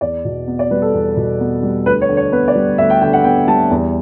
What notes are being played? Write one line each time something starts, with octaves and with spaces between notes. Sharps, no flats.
E2 D5
B2
B3
D5
G3 B4
A4
E2
B2
B3
G3
D2 B4
C#5
D3
C#5
B3 B4
D5
G3
D2 E5
G5
D3 G5
F#5
B3 G5
G3 A5
E2